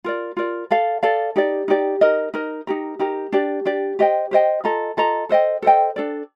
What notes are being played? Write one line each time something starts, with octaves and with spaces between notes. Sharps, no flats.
F4 A#4 D5
F4 A#4 D5
A4 D5 F5
A4 D5 F5
D#4 G4 D5
D#4 G4 D5
D#4 A#4 D#5
D#4 A#4 D#5
D#4 G4 A#4
D#4 G4 A#4
D4 G4 D5
D4 G4 D5
G4 C5 D#5 G5
G4 C5 D#5 G5
F4 A4 D#5 A#5
F4 A4 D#5 A#5
A4 C5 D#5 G5
A4 C5 D#5 G5
D4 A4 D5